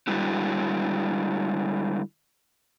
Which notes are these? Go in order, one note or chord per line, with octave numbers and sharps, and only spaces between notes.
D3 G3 G#3 E4 F#4